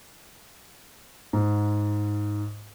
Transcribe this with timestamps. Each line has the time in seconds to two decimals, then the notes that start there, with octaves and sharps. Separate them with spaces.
1.33 G#2